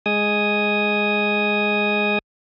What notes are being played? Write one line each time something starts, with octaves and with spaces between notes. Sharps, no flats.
G#3 G#5 D#6